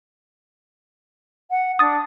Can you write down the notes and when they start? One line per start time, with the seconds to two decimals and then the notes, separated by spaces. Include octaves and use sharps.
1.50 F#5
1.79 D4 D#6 A6